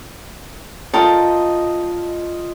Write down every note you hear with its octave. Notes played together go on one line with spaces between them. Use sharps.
F4 A4 A#4 D#5 G5